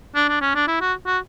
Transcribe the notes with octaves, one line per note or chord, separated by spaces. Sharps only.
D4
D4
C#4
D4
E4
F#4
F#4